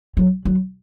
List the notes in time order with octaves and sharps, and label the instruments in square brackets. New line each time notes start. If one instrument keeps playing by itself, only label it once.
[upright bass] F#3
F#3